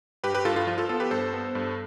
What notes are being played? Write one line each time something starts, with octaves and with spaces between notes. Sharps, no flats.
G2 G4 B4
G4 B4
G2 F4 A4
F4
F3 F4
F4 A4
B3 F4 A4
G4 B4
G2 A4 C5
B3
G2